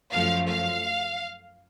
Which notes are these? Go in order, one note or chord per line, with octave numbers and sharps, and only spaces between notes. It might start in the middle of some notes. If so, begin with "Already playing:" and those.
F#2 F3 A3 F5
F5